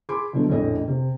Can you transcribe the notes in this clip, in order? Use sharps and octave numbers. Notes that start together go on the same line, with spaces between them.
G#4 B5 C6 D6
B2 D3 F#3 A3
A#1 F2 A2 C#4 A4 D#5
C3